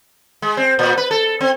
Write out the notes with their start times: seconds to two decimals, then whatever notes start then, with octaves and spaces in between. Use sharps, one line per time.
0.42 G#3
0.57 C4
0.79 A#2
0.97 B4
1.11 A4
1.41 C4